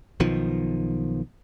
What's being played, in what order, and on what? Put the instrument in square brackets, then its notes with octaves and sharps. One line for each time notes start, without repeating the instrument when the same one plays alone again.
[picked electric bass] B1 B2 D#3 F3